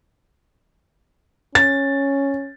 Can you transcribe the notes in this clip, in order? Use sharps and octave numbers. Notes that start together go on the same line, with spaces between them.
C#4 A6